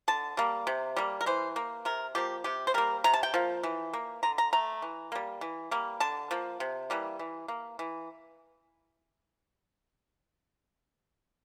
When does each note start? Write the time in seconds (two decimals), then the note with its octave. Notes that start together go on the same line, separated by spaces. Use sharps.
0.08 D3 A5
0.37 G3 A#3
0.67 C3
0.97 G3 A#3
1.21 A#4
1.26 E3 C5
1.56 A#3
1.85 C3 A#4
2.15 F3 A#3 G4
2.44 C3 G4
2.67 C5
2.74 G3 A#3 A#4
3.04 C3 A#5
3.14 A5
3.23 G5
3.34 F3 A#3
3.63 E3
3.93 A#3
4.23 D3 A#5
4.38 A#5
4.53 A3 A#5
4.82 E3
5.12 G3 A#3
5.41 E3
5.71 G3 A#3
6.00 D3 A5
6.31 F3 A#3
6.60 C3
6.90 E3 G3 A#3
7.19 E3
7.48 A#3
7.79 E3